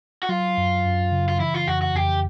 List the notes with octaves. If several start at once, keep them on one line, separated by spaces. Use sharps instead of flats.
F#4
F#3 F4
F#2
F#2
C#3
F4
E3 E4
F4
F2 F#4
F#4
F2 G4